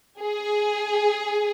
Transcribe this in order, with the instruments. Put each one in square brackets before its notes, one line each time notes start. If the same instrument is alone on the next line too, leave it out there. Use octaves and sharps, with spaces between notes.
[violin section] G#4